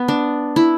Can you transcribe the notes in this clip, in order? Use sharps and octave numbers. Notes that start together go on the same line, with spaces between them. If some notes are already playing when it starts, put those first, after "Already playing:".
Already playing: B3
D4
E4